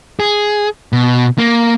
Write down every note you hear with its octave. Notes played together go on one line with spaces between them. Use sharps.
G#4
B2
A#3